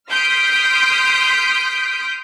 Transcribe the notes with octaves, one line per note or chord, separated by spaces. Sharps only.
C6 D#6 F6 G6 B6 D7